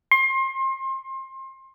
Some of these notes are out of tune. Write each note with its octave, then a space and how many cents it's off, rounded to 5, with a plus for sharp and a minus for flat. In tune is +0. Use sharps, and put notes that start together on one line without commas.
C6 +30